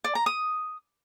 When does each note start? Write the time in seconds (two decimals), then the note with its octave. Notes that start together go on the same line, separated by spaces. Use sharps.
0.04 D5
0.15 A#5
0.26 D#6